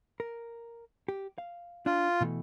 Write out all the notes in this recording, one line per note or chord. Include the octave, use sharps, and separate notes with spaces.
A#4
G4
F5
D4 F4
B2 E3 A3